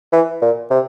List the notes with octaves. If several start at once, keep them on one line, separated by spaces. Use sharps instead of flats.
E3
A#2
C3